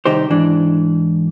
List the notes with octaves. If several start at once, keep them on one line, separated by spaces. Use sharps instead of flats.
C2 D#3 D#4 G4 C5
G#2 E3 D4